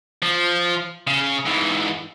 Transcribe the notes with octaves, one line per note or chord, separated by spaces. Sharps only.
F3
C#3
G#2 E3